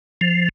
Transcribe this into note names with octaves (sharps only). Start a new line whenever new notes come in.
F3